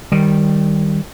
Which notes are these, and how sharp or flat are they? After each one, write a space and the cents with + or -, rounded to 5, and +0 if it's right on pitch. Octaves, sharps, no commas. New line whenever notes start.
D#3 +0 G3 +0